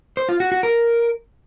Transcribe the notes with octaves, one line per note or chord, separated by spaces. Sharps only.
C5
F4
F#4
F#4
A#4